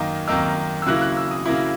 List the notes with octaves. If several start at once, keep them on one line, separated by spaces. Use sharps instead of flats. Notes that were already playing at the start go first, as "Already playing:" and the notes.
Already playing: F#2 D#3 A#3 D#4
F#2 D#3 A#3 D#4 E6
E6
C#3 F#3 A#3 E4 F#6
F#6
E6
D#6
C#3 F#3 A#3 E4